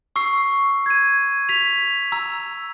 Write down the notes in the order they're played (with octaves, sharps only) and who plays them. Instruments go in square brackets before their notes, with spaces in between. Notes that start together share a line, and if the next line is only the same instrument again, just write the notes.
[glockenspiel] C#6 E6 C7
G#6 D#7
B6 F7
A#5 E6